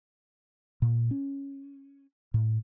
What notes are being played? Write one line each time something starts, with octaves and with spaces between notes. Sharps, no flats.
A#2
C#4
A2